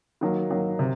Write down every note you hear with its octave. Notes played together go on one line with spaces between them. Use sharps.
D#3 F#3 A#3
D#3 F#3 A#3
C3